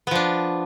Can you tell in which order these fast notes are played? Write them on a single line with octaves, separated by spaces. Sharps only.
B3 F3 D4